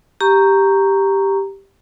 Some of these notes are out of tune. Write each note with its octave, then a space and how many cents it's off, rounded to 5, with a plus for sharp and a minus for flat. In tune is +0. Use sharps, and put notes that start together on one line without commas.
G4 +0 A#5 +0 C#6 +0